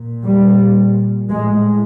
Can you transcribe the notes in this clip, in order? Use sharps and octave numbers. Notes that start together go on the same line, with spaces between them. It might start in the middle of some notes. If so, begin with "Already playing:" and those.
Already playing: A#2
G3
A2 G#3